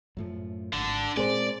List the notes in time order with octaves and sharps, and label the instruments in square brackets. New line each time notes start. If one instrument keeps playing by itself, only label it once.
[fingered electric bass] F#2 A2 F3
[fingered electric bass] G#1 [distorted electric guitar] D3
[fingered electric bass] A#2 G#3 C4 [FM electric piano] G#4 A#4 C5 [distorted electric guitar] D5